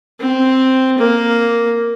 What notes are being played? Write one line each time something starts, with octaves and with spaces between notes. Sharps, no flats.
C4
A#3